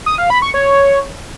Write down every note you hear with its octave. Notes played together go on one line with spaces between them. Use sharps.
D#6
F5
B5
C#6
C#5